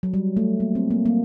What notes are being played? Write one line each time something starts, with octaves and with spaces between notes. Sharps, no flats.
F#3
G3
A3
A#3
C4
A#3
A#3